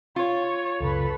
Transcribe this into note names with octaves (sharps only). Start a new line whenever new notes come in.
F4 C#5
C#2 F#2 C#3 A4 B4